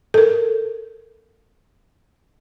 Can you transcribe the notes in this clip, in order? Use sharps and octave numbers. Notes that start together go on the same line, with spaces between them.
A4 A#4